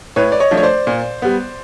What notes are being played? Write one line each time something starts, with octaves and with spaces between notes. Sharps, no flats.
A2 B4 C#5
D5
C#5 D#5
F3 A3 D4
C#5
C5 D5
A#2
G3 B3